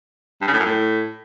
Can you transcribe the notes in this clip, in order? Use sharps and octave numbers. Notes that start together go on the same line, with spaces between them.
G2
C#3
A2
F#2
A2